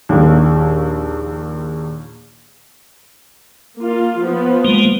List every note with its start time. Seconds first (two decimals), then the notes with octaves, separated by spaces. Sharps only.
0.09 A#1 D#2
3.78 A#3 F4
4.20 F3 B3
4.65 G3 G#3 A#3